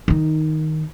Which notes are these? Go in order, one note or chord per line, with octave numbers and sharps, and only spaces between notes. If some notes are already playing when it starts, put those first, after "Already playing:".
D#3 D#4